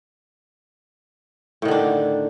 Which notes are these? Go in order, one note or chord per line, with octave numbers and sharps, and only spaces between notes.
A2 D3 D#3 D4